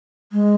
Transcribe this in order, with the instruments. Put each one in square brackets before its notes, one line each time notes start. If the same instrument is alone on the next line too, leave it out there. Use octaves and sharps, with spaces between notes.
[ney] G#3